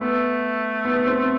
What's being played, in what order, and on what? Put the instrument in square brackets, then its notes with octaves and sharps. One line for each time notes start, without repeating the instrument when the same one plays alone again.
[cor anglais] A3 [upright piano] B3
[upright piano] B3
C4